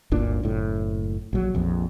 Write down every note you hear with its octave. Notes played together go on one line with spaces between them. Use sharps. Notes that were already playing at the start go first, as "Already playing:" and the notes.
G1 D2 A#2 D4
F#1 A2
A#1 F#3
A#1 F2